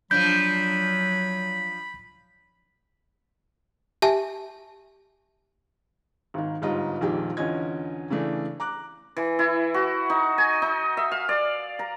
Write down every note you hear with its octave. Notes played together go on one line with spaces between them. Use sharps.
F3 F#3 D4 B5 G6
G4 E5 G#5 A5
G#1 D#3
G1 G#2 G3 F4 D#5
A#1 F2 D#3 G#3 G4
E2 D3 C#4 F4 D#5 G#6
C#3 E3 A3 D4
A#5 D6 F#6
E3
E4
F#4
D#4
G#5
D#4
E5
F5
D5
A#5